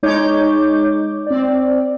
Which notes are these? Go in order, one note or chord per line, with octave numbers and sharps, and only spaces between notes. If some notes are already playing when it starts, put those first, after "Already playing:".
G#3 D#4 C#5 D6 G6
C4 D5